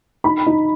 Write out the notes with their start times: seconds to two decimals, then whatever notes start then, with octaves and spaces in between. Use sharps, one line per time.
0.24 D#4 B5
0.47 D#4